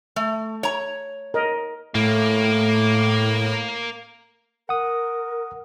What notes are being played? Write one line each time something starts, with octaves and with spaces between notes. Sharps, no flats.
A3
C#5 A#5
A#4 D#5
A2 A3 A#3
A#4 F#5 D#6